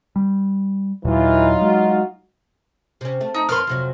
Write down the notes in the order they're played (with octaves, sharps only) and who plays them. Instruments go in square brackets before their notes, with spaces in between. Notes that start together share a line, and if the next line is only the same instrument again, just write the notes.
[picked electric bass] G3
[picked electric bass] D#2 A#2 [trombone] E3 [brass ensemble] F#3 D#4 F4
[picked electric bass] G#3 [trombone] F#4
[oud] C3 C#4
A3
[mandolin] D#4
[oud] F2 A#3 B4 [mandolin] C6 F6
[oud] F2 C3 F#3